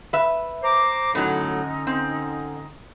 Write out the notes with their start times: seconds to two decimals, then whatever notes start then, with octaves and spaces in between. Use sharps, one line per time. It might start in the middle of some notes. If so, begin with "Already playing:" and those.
0.13 B4 E5
0.63 C5 A#5 D6
1.15 A2 D3 F#3 C#4 D#4
1.87 C4